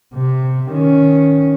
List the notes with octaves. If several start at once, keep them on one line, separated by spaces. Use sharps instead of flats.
C3
D#3 C#4